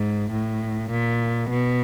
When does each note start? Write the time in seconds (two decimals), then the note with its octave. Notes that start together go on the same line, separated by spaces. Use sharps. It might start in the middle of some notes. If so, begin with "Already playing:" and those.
Already playing: G#2
0.32 A2
0.90 A#2
1.50 B2